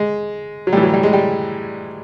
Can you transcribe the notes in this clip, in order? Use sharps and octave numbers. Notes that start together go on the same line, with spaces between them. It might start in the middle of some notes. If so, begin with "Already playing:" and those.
Already playing: G#3
F#3
A2 E3 G3
F#3
G3
G#3
G3